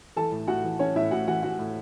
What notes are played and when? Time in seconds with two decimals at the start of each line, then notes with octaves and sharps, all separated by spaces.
0.16 E3 A4 A5
0.32 A2
0.47 A2 F#4 F#5
0.64 E3
0.79 E3 C#4 C#5
0.96 A2 E4 E5
1.11 A2 F#4 F#5
1.27 E3 F#4 F#5
1.43 E3 F#4 F#5
1.59 A2